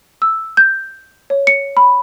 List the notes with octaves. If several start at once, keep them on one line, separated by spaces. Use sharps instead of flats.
E6
G6
C#5
C#7
B5